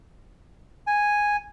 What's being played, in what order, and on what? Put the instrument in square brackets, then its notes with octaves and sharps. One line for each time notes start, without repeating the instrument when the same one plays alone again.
[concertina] G#5